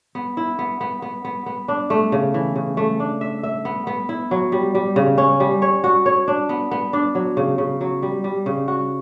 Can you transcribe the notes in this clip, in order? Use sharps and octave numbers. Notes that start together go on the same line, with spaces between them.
B3
E4
B3
B3
B3
B3
B3
D4
A3
C#3
E3
C#3
A3
D4
E5
E5
B3
B3
E4
F#3
G3
G3
C#3
C#4
G3
C#5
F#4
C#5
D4
B3
B3
D4
F#3
C#3
C#3
F#3
G3
G3
C#3
F#4